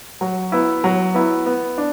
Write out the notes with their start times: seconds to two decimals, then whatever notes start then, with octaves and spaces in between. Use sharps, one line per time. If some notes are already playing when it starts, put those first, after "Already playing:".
0.21 F#3
0.52 B3 E4
0.84 F#3
1.14 B3 E4
1.46 B3
1.78 D4